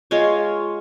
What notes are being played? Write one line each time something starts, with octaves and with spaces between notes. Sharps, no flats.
G#3 F4 C#5